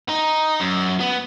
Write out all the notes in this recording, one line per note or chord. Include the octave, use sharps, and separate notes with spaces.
D#4
F#2
B3